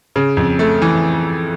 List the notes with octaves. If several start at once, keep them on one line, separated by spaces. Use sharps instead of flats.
C#3
F2
A3
E3